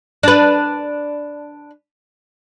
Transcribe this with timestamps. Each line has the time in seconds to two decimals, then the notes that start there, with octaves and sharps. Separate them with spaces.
0.23 D4 B4